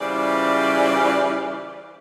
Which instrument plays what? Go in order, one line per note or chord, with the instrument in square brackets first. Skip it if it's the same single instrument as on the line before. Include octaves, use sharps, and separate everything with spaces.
[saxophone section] C#3 E3 G3 F4 C5 D5